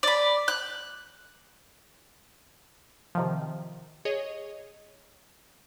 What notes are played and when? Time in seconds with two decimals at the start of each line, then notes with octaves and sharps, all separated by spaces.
0.03 D5 B5
0.48 F#6
3.15 C3 D#3 F3
4.05 G#4 C#5 D#5